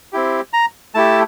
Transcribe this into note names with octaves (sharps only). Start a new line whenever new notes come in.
C4 E4 G4
A#5
A3 E4 G4 A5